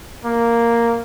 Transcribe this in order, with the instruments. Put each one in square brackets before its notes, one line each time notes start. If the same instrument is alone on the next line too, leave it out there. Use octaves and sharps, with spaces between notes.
[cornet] A#3